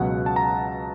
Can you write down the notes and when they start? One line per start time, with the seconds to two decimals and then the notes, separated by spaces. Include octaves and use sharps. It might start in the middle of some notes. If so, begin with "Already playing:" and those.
Already playing: C#2 B2 F#3 F#5
0.26 A5
0.36 A#5